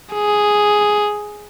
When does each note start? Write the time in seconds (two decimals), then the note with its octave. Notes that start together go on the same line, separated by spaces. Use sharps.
0.14 G#4